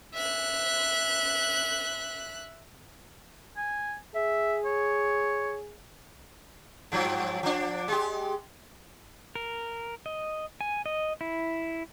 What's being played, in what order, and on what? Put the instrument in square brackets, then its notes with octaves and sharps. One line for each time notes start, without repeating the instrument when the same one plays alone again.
[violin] E5 F#6
[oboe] G#5
[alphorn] G#4 [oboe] E5
[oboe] C#5
[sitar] G2 F3 F#3
F3 D4
G#3 G4
[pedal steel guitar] A#4
D#5
G#5
D#5
E4